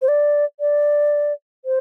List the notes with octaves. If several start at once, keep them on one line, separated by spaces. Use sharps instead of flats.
C5
D5
D5
C5